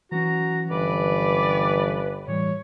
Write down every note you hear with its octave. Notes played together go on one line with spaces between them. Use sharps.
E3 F#3 C#4 F#4 A#5
G1 B4 D5
A2 E3 G3 C#5